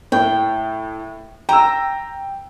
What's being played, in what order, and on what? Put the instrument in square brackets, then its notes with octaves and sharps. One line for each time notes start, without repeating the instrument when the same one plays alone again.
[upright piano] A2 [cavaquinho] G5
[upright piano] G5 E6 [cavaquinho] A#5